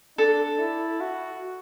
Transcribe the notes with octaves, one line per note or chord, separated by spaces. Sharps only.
D4 A4
E4
F#4